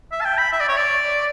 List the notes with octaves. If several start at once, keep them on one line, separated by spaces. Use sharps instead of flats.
E5
A5
G5
B5
E5
D5
C#5
D5